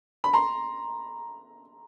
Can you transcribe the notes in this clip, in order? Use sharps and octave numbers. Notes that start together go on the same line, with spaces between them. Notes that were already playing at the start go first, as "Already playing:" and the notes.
B5
A#5 C6